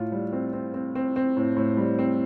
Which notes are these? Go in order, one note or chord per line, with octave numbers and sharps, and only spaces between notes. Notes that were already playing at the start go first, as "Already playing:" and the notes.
Already playing: A2 F4
G3
C4
C4
C4
C4
C4
A2
A2
G3
C4